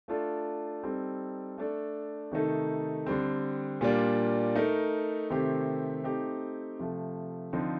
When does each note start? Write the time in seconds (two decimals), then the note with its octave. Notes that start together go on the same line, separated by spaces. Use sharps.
0.08 A3 D4 F4 A4
0.83 G3 C4 D#4 A4
1.58 A3 D4 A4
2.31 C3 D#3 A3 D#4 A4
3.06 D3 G3 C4
3.81 A#2 G3 A#3 D4 F4
4.55 A3 D#4 A#4
5.30 C3 D#3 A3 C4 G4
6.04 A3 C4 D#4 G4
6.79 C3 F3 A3
7.53 D3 F3 C4 D#4